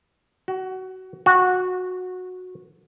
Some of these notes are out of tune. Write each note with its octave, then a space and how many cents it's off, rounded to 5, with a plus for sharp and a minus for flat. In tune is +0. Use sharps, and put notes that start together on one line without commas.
F#4 +20
F#4 -15